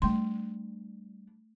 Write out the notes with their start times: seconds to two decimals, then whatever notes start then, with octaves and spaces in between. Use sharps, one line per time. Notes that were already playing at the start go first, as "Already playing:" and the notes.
0.02 G3 A3 D4 C6